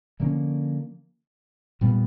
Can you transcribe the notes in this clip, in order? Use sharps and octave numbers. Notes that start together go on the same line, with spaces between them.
D3 F3 A#3 C#4
A#2 G3 B3